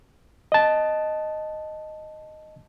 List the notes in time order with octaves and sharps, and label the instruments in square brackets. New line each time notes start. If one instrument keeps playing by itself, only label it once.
[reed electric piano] D#5 A5